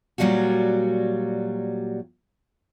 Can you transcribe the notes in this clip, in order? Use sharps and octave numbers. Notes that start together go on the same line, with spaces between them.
A#2 F#3 G3 F4 F#4